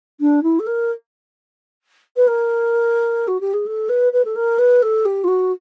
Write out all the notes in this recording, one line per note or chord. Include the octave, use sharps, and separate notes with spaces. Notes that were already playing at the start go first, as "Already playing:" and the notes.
D4
E4
A4
A#4
B4
A#4
F#4
G4
G#4
A4
B4
B4
A4
A#4
B4
A4
G4
F4
F#4